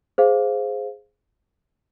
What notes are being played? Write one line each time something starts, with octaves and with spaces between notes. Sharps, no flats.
G#4 C5 F5